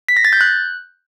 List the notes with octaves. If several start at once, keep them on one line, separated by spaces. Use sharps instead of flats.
B6
A#6
A6
G6
F#6